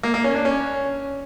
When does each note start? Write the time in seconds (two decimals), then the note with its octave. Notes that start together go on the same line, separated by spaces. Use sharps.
0.03 A#3
0.14 A#3
0.24 C#4
0.35 D4
0.45 C#4